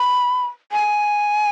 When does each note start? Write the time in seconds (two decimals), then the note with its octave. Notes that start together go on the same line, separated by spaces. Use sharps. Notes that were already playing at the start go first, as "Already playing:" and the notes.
Already playing: B5
0.72 G#5